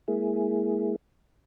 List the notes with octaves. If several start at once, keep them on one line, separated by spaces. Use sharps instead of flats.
G#3 A#3 E4 G#4